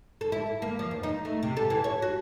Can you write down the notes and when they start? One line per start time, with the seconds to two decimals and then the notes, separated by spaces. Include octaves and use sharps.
0.21 A4
0.32 E4
0.62 A#3
0.79 F3
0.91 E2
1.03 D#4
1.25 A3
1.43 C3
1.57 A4
1.70 E3
1.84 C#5
2.02 F#4